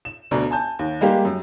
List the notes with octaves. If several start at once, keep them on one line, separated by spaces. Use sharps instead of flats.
E7
D2 B2 D5 A#5
G#5 A5 G6
D#2
G3 G#3 A#3 G4
F#2